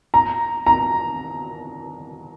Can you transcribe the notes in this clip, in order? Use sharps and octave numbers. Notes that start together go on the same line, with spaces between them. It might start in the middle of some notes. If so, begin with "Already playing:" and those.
A#5
A#5